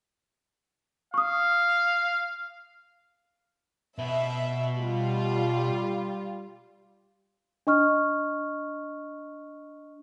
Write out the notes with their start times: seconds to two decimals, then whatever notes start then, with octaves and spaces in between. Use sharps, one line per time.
1.14 F5 C#6 D#6
3.98 B2 B4 E5
4.79 G3 F4
7.67 D4 D#5 C#6 F6